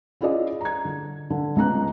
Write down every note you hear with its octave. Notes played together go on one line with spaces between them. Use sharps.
C#4 E4 F4 G#4 D5 D#5
A#5 G#6
D3
D3
C#2 B3 A#5 F#6